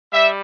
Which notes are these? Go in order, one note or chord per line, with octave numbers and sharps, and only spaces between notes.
G3 E5